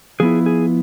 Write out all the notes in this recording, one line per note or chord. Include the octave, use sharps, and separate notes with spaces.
F3 B3 E4 G#4
G#4